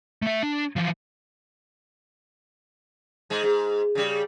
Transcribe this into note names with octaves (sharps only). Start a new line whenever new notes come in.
A3 E5
D4
E3 F3
G#2 G#3
G#2
C#3 G3